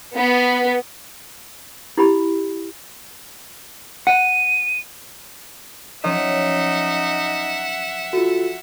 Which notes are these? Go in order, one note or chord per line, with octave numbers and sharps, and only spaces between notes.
B3
E4 G4 B5
F#5 D#7
F3 F#3 C#4 D#4 E5 F#5
F4 F#4 A4